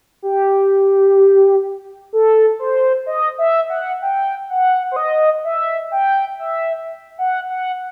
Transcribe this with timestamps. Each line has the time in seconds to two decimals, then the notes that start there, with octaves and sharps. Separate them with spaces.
0.22 G4
2.13 A4
2.59 C5
3.06 D#5
3.38 E5
3.70 F#5
4.02 G5
4.50 F#5
4.92 C5
4.96 D#5
5.44 E5
5.92 G5
6.40 E5
7.18 F#5
7.50 F#5